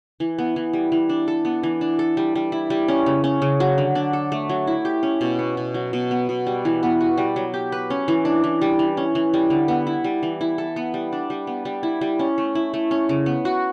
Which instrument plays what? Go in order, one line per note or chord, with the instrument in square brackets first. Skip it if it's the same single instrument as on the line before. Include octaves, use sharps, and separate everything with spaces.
[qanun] E3
B3
E3
G3
E3
D4
A4
B3
E3
D4
A4
G3
G3
E4
G3
C#4
C#3
C#4
C#3
F#3
D3
D4
A4
A3
F#3
E4
G4
C#4
B2
B3
B2
F#3
B2
B3
B2
G3
E3
B3
F#4
G3
F#3
G4
B4
C#4
E3
D4
E3
G3
E3
C#4
E3
G3
D3
B3
E4
G3
E3
E4
A4
B3
G3
D4
G3
B3
G3
E4
G3
C#4
A3
E4
A3
C#4
C#3
B3
F#4